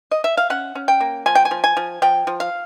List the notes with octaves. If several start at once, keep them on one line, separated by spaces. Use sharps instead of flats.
D#5
E5
F5
C#4 F#5
C#4
G5
A#3
F3 G#5
G5
G#5
F3
G#5
F3
F3 G5
F3
F5